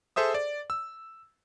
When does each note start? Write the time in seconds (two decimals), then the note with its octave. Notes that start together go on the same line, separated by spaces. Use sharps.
0.16 G#4 A4 C5 E5 D#6
0.34 D5
0.70 E6